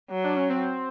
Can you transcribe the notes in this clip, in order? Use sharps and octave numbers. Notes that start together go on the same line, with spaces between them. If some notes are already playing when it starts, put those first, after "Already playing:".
F#3
D4
C#4
C4